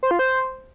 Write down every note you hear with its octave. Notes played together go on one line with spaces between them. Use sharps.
C5
F4
C5